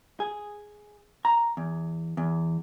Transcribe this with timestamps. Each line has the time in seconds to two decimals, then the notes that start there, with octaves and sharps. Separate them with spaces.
0.20 G#4
1.25 A#5
1.57 E2
2.17 E2